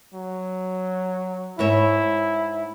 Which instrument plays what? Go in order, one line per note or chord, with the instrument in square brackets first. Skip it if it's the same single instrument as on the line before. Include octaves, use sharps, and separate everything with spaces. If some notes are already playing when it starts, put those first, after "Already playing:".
[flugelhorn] F#3
[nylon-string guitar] G#2 C#5 E5 [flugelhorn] E4